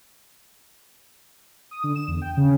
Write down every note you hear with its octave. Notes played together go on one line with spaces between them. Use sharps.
D#6
D3
E7
E2
G5
C#3